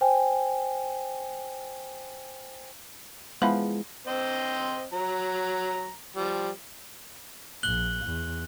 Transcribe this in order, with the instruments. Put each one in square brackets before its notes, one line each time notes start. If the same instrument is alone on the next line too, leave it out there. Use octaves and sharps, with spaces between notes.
[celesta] C5 G5 G#5
[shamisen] E3 F3 B3 [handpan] G#3 E4
[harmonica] C4 C5 D#5
F#3 A#5
F3 G3
[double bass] A#1 [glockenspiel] F#6 F#7 G7
[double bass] E2